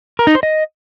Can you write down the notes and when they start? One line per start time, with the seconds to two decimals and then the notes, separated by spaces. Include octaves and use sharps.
0.19 A#4
0.27 D#4
0.35 C5
0.43 D#5